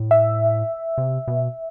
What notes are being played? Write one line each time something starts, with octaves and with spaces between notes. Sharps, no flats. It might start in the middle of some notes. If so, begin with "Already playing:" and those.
Already playing: A2
E5
C3
B2